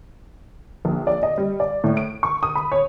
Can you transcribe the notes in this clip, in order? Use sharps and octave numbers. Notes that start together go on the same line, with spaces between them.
A#1
D5
D#5
G3
D5
A2
D7
C#6
D#6
B5
C#5